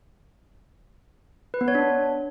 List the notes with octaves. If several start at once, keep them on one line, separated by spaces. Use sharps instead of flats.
B4
B3
C#5
D4